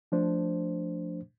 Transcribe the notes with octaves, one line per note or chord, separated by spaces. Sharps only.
F3 A3 D4 C5